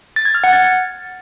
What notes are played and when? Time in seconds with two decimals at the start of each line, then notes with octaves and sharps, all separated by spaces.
0.16 A6
0.25 G#6
0.34 F6
0.44 F#5
0.53 A6